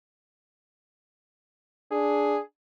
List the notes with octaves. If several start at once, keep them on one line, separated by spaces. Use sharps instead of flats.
D4 G#4